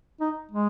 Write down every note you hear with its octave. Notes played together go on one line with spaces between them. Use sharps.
D#4
G#3